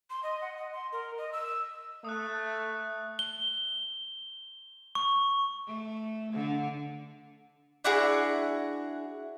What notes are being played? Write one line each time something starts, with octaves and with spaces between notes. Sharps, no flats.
C6
D#5
F#5
D#5
C6
A#4
D#5
E6
A3 D#6 F#6
G7
C#6
A3
D3
D4 E4 F#4 G#4